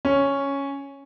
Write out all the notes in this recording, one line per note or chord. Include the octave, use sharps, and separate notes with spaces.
C#4